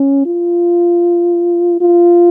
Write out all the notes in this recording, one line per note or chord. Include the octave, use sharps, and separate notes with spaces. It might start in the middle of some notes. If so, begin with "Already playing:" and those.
Already playing: C#4
F4
F4